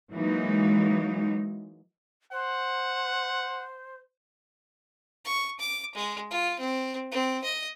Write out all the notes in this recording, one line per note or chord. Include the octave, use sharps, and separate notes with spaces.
E3 F#3 G#3 A#3 D#4
C5 F#5
C#6
D6
G#3
F4
C4
C4
D#5